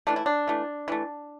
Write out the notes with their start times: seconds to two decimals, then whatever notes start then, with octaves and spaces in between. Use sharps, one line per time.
0.07 E3 A3 D4
0.16 E4
0.26 D4
0.48 E3 A3
0.88 E3 A3